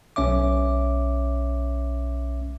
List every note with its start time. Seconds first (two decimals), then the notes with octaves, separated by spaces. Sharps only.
0.16 B1 C#4 C#5 E5 D6